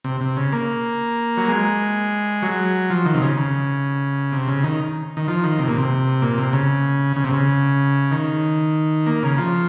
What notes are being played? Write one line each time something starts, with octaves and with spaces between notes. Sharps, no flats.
C3
C3
C#3
A#3
F#3
G#3
F#3
F3
D#3
C3
C#3
C#3
C3
C#3
D#3
D#3
F3
D#3
C3
A#2
C3
A#2
C3
C#3
C#3
C3
C#3
D#3
A#3
C#3
F3